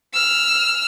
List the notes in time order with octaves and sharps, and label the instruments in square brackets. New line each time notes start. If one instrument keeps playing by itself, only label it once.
[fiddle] E6 F6